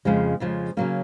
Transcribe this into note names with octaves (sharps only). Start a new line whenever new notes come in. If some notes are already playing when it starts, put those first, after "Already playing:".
F2 C#3 F3 G#3
F2 C#3 F3 G#3
C#3 F#3 A#3 C#4